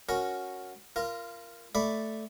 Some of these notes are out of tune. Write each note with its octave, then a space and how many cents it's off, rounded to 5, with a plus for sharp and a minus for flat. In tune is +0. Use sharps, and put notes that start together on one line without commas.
C#4 +0 F#4 -5 A#4 +0
F4 -25 A#4 +0
A3 +0 D5 +0 B5 +0